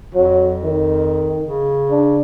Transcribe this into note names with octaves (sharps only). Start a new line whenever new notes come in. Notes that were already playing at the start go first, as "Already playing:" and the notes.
F2 F#3
D#3
C#3
D4